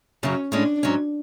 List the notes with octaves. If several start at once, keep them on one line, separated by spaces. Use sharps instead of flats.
F#2 C#3 F#3 C#4
A2 G#3 C#4 D4
G#2 F#3 C#4